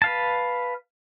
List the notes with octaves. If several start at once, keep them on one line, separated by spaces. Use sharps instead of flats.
B4 F5 A5